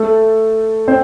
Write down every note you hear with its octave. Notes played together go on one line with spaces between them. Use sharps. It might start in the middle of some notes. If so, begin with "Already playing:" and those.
Already playing: A3 A4
C4 C5